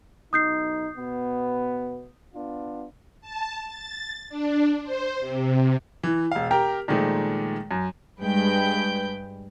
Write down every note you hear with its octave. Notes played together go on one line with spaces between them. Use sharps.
B1 D#4 D#6 G6 C7
B2 B3
B3 D4 F4
A5
A6
D4
C5
C3
E3
E1 F5
G4 A#4 G5
A#2 D#3 F3 G#3 A3
F#2
G2 G#3 B4 G5 G6